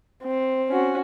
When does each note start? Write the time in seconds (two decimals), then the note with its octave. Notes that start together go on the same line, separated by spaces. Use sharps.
0.23 C4
0.69 C#4 F#4